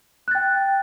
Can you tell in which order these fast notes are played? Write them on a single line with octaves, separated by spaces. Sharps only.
F#6 A6 G5